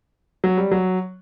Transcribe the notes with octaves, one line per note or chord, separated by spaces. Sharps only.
F#3
G3
F#3